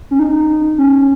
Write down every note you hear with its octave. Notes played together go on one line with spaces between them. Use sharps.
C#4
D#4
C#4